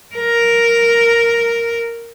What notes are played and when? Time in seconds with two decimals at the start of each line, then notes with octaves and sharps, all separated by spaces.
0.15 A#4